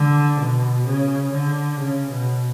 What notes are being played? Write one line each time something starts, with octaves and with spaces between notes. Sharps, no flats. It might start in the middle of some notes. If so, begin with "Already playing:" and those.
Already playing: D3
B2
C#3
D3
C#3
B2